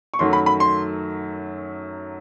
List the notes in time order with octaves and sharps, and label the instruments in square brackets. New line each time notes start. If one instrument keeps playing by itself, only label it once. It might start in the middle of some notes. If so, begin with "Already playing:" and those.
[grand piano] C#6
[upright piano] F#2 D#3 F#3 A3 [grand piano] C6
[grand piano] B5
B5
C6